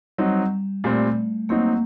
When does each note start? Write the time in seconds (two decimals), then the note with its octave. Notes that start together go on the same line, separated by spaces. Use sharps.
0.18 F#3 G3 C4 D#4
0.84 A#2 G3 A3 C4
1.49 F#3 A#3 C4 D#4